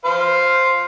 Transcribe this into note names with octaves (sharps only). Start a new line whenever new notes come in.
C5 F5